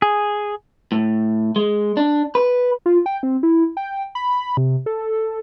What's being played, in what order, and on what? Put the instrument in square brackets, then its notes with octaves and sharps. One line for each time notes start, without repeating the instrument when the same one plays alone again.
[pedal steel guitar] G#4
[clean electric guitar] A2
G#3
D4
B4
[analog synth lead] F4
G5
C4
E4
G5
B5
C3
A4